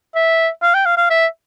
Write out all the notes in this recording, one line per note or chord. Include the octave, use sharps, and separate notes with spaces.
E5
F5
G5
F5
F5
E5